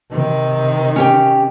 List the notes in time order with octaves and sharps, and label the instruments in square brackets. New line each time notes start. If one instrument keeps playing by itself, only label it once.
[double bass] C3 D#3
[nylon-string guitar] C#4 G4 G5